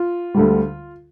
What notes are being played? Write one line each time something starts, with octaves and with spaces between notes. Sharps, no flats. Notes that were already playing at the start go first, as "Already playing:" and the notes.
Already playing: F4
D2 D3 G3